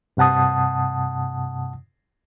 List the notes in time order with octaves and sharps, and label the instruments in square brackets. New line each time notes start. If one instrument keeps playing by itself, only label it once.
[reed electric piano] G2 C3 F#5 A5 D#6